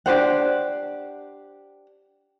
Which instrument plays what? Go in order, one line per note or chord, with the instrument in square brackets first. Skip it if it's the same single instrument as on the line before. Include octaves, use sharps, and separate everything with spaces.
[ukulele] D4 G4 C5 F#5